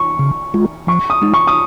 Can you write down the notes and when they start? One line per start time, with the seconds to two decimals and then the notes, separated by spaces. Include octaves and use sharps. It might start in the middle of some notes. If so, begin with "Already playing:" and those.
Already playing: C#6
0.19 C#3
0.54 G#3 F4
0.87 F3 C#6
1.10 D#6
1.22 G#3 D#4
1.34 C#6
1.47 D#6